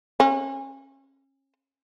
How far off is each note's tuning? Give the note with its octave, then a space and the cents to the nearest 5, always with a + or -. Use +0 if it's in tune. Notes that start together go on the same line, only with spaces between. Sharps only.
C#4 -30